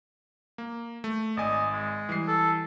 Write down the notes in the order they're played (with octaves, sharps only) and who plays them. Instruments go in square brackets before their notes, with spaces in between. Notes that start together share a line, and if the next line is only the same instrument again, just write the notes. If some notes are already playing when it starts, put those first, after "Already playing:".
[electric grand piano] A#3
A3
[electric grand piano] G#1 D5 G#5 [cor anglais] D#5
[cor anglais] G#3
[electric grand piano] E3 G3 C7
[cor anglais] A4